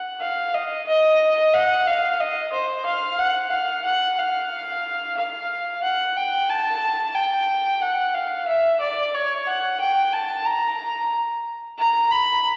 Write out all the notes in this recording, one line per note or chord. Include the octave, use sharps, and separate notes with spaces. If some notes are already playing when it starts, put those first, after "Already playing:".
Already playing: F#5
F5
D#5
D#5
F#5
F5
D#5
C5
F5
F#5
F5
F#5
F5
F5
F#5
G5
A5
G5
F#5
F5
E5
D5
C#5
F#5
G5
A5
A#5
A#5
B5